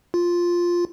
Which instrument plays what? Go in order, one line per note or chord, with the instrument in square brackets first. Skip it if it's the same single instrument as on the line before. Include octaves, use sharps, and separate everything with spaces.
[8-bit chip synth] F4